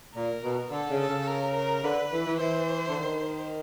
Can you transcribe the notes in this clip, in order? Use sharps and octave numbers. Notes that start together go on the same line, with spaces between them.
A#2 A#4
B2
D3 A4
C#3
A4
C#3
A#4
A#4
D3 B4
E3
E3
E3 C5
D3
D#3